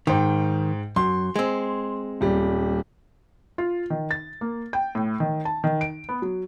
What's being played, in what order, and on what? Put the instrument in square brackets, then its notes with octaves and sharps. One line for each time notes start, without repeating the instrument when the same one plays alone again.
[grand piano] G#2 G5 [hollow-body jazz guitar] D#3
[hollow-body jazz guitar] F#2 [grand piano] C6
[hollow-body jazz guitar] G#3 C4
[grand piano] D#1 G3
[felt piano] F4
D#3
A6
A#3
G5
A2
D#3
A5
D#3
D7
B3
F#3